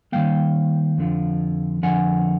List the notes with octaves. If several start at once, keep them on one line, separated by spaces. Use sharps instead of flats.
D#3 G3 A#3 F5 G5
F2 D3 F3
F2 D3 F3 F#5 G#5